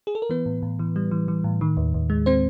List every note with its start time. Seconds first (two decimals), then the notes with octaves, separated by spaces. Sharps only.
0.07 G#4
0.15 A4
0.22 A#4
0.30 E3 B3 B4
0.46 A2
0.62 A2
0.79 E3
0.96 G3
1.11 E3
1.28 E3
1.44 A2
1.61 D#3
1.77 D#2
1.94 D#2
2.10 G#3
2.26 C4 C5